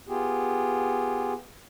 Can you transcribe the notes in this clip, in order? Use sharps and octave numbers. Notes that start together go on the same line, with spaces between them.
B3 F4 G4 G#4